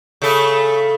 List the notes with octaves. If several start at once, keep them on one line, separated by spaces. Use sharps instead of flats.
C#3 A3 A4